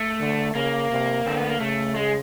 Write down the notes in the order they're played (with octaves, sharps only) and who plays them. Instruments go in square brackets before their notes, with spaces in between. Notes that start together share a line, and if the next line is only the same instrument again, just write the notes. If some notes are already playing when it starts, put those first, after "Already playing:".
Already playing: [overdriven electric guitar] A3
[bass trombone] D3
[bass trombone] C#3 [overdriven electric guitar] A#3
[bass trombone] C3
[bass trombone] D3 [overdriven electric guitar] C4
[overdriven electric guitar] B3
A#3
[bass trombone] C#3 [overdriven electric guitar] A3
[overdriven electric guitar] G#3